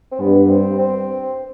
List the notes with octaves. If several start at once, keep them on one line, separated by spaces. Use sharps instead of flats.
C4
G2 B3
C4
C4